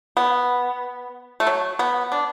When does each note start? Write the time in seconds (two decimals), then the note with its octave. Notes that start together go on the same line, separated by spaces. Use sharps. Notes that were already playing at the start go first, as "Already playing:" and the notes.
0.17 B3
1.40 A3
1.47 F#3
1.79 B3
2.12 D4